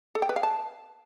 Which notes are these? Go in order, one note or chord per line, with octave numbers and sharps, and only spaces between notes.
A4
G5
B4
F5
A5